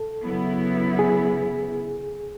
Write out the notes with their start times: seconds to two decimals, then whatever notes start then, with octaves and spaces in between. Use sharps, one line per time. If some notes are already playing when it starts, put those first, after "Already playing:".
Already playing: A4
0.21 C#3 F#3 B3 E4
0.99 G#4